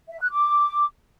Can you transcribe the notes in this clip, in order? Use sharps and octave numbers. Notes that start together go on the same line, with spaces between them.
E5
F#6
D6